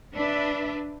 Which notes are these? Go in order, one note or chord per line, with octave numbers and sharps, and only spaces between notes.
D4 B4 D5 E5